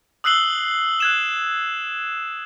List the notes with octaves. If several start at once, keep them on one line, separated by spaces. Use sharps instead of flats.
D#6 E6 F#6 C7 F#7 G7
F#6 G#6 E7